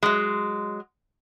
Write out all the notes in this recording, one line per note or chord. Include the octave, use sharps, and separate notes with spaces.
F#3 G#3